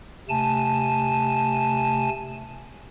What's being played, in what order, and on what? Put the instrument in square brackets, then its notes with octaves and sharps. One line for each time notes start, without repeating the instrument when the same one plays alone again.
[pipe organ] C3 A3 G#5 A5